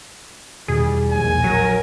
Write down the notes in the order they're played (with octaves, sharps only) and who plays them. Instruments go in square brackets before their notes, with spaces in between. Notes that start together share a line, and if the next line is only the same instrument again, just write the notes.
[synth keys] E2 B2 D#3 [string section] G3 [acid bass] G#4
[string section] A#1 D#2 G#2 [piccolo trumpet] G#5
[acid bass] F#3 [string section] A#4